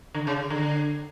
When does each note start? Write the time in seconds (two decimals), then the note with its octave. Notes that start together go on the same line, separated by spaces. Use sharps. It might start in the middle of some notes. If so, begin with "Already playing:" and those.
0.14 D3
0.27 C#3
0.50 D3